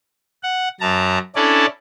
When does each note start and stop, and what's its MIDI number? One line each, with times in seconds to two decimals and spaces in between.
0.43 0.69 78
0.80 1.18 42
0.80 1.18 81
0.80 1.18 82
1.36 1.66 61
1.36 1.66 62
1.36 1.66 64
1.36 1.66 69
1.36 1.66 74